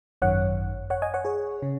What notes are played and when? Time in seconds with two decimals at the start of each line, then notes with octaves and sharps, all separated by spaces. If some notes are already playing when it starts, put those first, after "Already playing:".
0.22 G#1 F#2 D#3 C#5 F#5
0.90 C#5 F#5
1.02 D#5 G#5
1.14 C#5 F#5
1.25 G#4 C#5
1.62 C#3